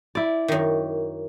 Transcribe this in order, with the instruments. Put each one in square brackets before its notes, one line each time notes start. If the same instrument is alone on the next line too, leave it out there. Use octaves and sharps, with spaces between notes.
[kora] E4 D5
[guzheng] F#2 D#3